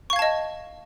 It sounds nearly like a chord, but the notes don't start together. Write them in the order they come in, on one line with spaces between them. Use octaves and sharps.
C#6 F5 G#6 A5 D#5